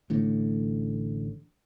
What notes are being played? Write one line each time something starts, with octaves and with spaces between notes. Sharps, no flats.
A1 A2 D3